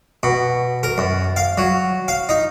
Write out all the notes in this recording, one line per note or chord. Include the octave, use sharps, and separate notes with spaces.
B2
A#4
F#2
F5
F#3
F5
D#4